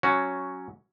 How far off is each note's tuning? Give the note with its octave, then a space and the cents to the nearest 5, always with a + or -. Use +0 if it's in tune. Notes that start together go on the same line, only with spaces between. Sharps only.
F#3 +0 C#4 +0 F#4 +0